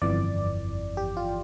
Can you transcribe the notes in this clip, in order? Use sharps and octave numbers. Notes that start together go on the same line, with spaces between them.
G1 F2 E3 D5
G4
F4